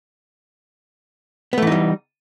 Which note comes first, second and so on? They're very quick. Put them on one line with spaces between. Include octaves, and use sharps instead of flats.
B3 A3 E3 D#4 G3